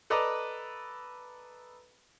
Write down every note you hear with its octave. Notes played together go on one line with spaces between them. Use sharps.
A4 B4 D5 D#5 A#5